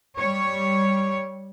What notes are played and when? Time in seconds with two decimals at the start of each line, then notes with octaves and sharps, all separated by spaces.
0.17 G3 C#5